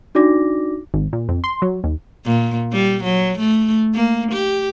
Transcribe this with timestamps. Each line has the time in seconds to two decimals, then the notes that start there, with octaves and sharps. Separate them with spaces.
0.15 D4 D#4 F#4 D5 D6 A#6
0.94 G#1
1.13 A#2
1.29 F2
1.44 C6
1.62 F#3
1.84 D#2
2.25 A#2
2.72 G3
3.04 F#3
3.39 A3
3.94 A#3
4.32 G4